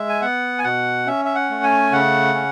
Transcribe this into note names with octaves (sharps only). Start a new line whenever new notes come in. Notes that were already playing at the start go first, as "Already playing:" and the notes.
Already playing: G#3 E5
G#5
B3 F#5
G#5
B2 F#5
C#4 E5
E5
F#5
A3
G#5
C#3 F#5
C#4